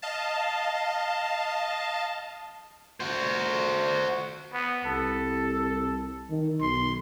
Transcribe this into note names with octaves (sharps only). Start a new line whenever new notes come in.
D#5 F5 A5
F#4 C5
B3
C2 A4
D#3
B1 C6